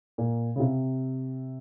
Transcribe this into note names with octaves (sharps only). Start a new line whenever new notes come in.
A#2
C#3
C3